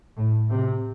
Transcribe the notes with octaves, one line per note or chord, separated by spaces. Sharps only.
A2
C3